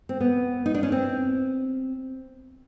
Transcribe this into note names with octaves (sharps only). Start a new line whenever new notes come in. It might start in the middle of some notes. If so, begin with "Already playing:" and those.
C4
B3
D#4
D4
C#4
C4